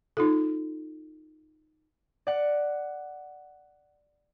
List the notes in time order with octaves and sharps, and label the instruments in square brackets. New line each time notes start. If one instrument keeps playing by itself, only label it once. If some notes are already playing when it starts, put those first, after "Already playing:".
[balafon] D#4 F4 A4
[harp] D5 F#5